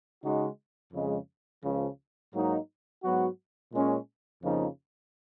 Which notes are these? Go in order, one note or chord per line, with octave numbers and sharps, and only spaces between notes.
C#3 G#3 D#4 F#4
F2 C#3 G#3
C#2 C#3 F3
G#2 F#3 A#3 D#4
G#2 F#3 B3 F#4
A#2 G#3 C#4 G#4
F2 C#3 F3 A#3 D#4